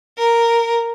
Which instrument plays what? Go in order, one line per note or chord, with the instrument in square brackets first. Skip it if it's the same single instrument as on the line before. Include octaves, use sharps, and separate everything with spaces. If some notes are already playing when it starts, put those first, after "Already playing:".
[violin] A#4